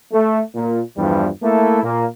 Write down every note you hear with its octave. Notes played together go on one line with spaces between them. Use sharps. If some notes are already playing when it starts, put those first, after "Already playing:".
A3
A#2
E2 G2 E3 F3 G3
A3 A#3 E4 A4
A#2 A#3